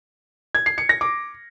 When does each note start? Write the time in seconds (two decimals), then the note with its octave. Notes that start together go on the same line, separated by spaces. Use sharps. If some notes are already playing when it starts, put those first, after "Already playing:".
0.55 G#6
0.66 C7
0.78 C#7
0.89 A#6
1.01 D6